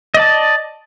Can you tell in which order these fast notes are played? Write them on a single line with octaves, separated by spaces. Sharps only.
D#5 D5 A5